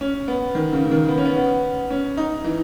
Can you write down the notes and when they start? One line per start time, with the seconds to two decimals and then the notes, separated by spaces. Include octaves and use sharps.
0.01 C#4
0.28 B3
0.55 D#3
0.73 C#3
0.85 C#3
0.91 D#3
1.09 B3
1.18 C#4
1.26 B3
1.36 B3
1.90 C#4
2.17 D#4
2.44 E3